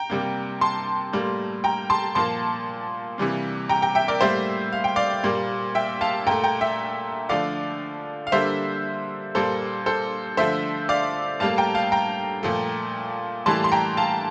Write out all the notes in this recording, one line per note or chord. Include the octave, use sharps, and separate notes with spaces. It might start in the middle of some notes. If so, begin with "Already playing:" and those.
Already playing: G5 A#5
C3 G3 A#3
A5 C6
A2 G3 A#3
G5 A#5
A5 C6
A#2 F3 A#3 A5 C6
C3 E3 G3 A#3
G5 A#5
G5 A#5
E5 G5
A#4 D5
A2 G3 A#3 C5 E5
F5
G5
D5 F5
A#2 G3 A#3
E5 G5
F5 A5
A#2 A3 G5 A#5
G5 A#5
E5 G5
D3 F3 A3 D5 F5
F5
D3 G3 A#3 C5 E5
A#2 G3 A#3 A4 C5
A4 C5
D3 F3 A3 C5 E5
D5 F5
A2 G3 A#3 F5 A5
G5 A#5
F5 A5
G5 A#5
A#2 F3 A3
A2 E3 G3 A#3 A5 C6
C6
G5 A#5
F5 A5